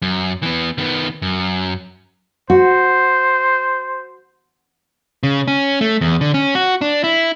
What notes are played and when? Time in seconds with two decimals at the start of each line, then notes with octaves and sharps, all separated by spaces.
0.02 F#2
0.43 E3 B3
0.78 D#3 B3
1.22 F#2
2.50 F#4 C5
5.23 C#3
5.48 C#4
5.81 A3
6.01 E2
6.21 D3
6.34 C#4
6.55 F#4
6.81 D4
7.04 E4